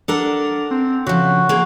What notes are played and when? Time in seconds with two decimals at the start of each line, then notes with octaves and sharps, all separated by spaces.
0.08 D4 A4 A#4 F#5
0.71 C4
1.06 C#3 F3 F#4
1.49 A#3 G#4